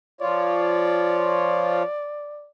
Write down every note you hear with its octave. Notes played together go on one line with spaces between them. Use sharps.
F3 F4 C#5 D5